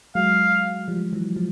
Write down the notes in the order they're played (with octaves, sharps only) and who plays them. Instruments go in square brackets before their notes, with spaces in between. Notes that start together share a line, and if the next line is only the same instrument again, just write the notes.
[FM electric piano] F#3 G#3 [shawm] F5
[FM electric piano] F3 G3
E3 F#3
F3